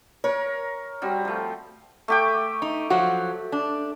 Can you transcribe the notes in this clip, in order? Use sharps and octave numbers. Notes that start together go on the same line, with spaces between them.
A#4 C#5
G3 C4 F#4
F3 A3
A3 G4 G5
D#4
F3 F#3 F#4
D4